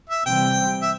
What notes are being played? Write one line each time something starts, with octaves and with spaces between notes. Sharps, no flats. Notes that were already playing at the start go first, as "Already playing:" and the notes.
E5
C3 E3 G3 C4 G5
E5